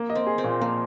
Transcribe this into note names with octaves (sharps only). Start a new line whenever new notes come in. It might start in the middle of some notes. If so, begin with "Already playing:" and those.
Already playing: A#3
D#5
C4
G#4
C4
A#2
F3 A#3